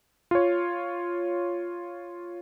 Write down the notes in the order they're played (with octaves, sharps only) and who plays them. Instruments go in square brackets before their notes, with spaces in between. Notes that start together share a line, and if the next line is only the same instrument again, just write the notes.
[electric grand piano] F4 C#5